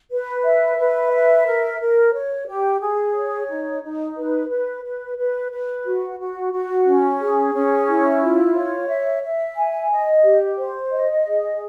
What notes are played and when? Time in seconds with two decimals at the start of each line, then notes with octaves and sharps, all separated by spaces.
0.11 B4
0.44 E5
0.78 B4
1.12 E5
1.46 A#4
1.80 A#4
2.13 C#5
2.47 G4
2.80 G#4
3.15 C#5
3.49 D#4
3.82 D#4
4.16 B4
4.49 B4
4.84 B4
5.17 B4
5.51 B4
5.85 F#4
6.19 F#4
6.52 F#4
6.86 C#4
7.20 G#4
7.53 C#4
7.88 E4
8.22 F4
8.55 C#5
8.88 E5
9.23 E5
9.56 G#5
9.90 D#5
10.23 G4
10.57 C5
10.91 D#5
11.26 G#4